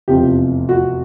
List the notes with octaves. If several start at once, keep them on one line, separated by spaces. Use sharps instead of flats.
F1 E2 C3 F3 G4
F#4